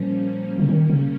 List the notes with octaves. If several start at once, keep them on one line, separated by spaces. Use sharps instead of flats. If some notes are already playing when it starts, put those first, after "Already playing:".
Already playing: A#2 F3 G3 A#3 C#4
C#3
D#3
C#3